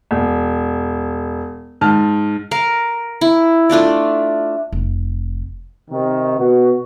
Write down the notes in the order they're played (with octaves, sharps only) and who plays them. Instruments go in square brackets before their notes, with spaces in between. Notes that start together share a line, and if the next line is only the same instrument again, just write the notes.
[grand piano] E1
G#2 A5 F6
[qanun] A#4 F5
E4
A3 D4 F4 D5
[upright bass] F1
[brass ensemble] C3 D#3
B2 F#4